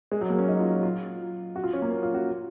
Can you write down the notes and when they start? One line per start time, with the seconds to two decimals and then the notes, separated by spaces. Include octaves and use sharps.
0.12 G#3
0.21 F#3
0.30 A#3
0.39 C#4
0.48 D#4
0.60 F4
0.83 F4
1.56 F#4
1.64 F4
1.73 C#4
1.82 A#3
1.91 C#4
2.03 F4
2.14 F#4